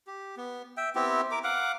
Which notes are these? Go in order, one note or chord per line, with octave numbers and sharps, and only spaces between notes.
G4
B3
E5 G5
B3 C4 E4 G4
A#4 D6
F5 F#5 D6